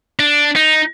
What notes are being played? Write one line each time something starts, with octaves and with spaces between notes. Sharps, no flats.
D4
D#4